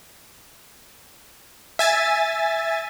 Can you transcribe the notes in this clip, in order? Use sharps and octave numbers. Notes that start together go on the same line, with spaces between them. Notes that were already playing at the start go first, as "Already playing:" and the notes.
E5 G#5 A6